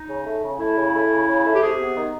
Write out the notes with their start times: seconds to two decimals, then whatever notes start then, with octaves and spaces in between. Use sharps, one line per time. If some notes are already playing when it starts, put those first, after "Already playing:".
Already playing: D#4
0.08 C#3
0.25 A3
0.43 C#3
0.60 A3 E4
0.77 C#3
0.94 A3
1.10 C#3
1.28 C#3
1.45 A3
1.55 G4
1.62 C3 G#4
1.80 B3
1.96 D#3